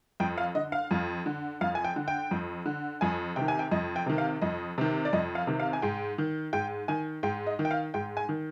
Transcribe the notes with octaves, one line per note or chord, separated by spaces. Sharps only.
F2 G5
F5
D3 D#5
F5
F2
D3
F2 F5
G#5
G5
D3
G5
F2
D3
F2 G#5
C3 D#3 G5
G#5
G5
F2 D#5
G5
C3 D#3
F5
F2 D#5
C3 D#3
D5
F2 D#5
F5
C3 D#3
F5
G#5
G#2 G5
D#3
G#2 G5
D#3 G#5
G#2 G5
D#5
D#3
G5
F5
G#2 G5
G#5
D#3